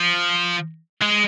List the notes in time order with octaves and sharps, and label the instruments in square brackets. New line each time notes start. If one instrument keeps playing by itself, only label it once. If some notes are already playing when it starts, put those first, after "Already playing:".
Already playing: [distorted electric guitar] F3
G#3